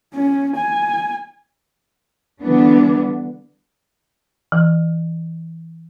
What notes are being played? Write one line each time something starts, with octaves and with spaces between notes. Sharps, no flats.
C#4
G#5
D3 E3 G3 B3 D4
E3